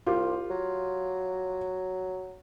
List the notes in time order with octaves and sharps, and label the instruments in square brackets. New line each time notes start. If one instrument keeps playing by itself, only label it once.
[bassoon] C2 [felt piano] F4 G4
[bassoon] F#3